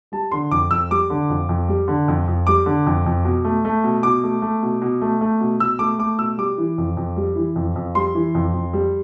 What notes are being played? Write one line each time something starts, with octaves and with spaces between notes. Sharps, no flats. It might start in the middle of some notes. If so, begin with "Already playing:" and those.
G3 A5
D3 C6
F2 D6
F2 E6
G3 D6
D3
F2
F2
G3
D3
F2
F2
G3 D6
D3
F2
F2
B2
A3
A3
B2
B2 D6
A3
A3
B2
B2
A3
A3
B2
B2 E6
A3 D6
A3 D6
B2 E6
G3 D6
E3
F2
F2
G3
E3
F2
F2
G3 C6
E3
F2
F2
G3